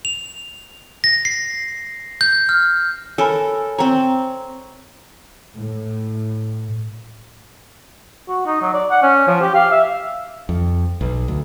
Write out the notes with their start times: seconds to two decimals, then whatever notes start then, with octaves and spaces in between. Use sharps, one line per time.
0.05 F7
1.04 A#6
1.25 C7
2.21 G6
2.49 F6
3.18 A4 A#4 C#5 G#5 B5
3.78 C4 C#5 A#5
5.57 A2
8.28 F#4
8.46 D#4
8.62 F#3
8.73 D5
8.90 F#5
9.02 C#4
9.28 F3
9.41 G4
9.55 F5
9.71 E5
10.49 F2
11.01 B1
11.28 D2